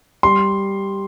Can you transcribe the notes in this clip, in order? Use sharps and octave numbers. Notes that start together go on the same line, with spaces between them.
G3 C6